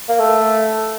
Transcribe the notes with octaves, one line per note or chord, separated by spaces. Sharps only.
A#3
A3